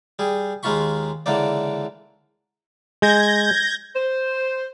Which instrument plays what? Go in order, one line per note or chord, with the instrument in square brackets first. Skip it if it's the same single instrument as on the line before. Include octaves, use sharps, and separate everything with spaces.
[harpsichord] G3 G#4
D#2 G#3 A#3 F4 B5 C#6
C#2 D3 E3 A#3 D5
[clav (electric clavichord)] G#3 [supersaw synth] G6 G#6 A#6
[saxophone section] C5